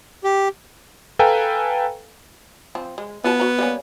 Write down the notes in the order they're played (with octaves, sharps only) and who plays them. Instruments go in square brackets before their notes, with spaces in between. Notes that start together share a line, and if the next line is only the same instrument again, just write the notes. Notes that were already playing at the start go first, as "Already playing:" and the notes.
[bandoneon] G4
[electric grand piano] A4 B4 F5 G5 G#5 A#5
[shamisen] F3 C4
G#3
[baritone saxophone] B3 [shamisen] F4 F#4 A5
[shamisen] F#4 A#5
G3 A#3 C#4